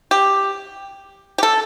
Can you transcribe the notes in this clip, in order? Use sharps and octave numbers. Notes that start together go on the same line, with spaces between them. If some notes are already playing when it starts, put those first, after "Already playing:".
G4
G4
A4